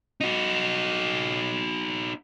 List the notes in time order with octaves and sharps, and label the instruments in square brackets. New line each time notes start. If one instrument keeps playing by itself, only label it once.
[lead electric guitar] D#4 F#4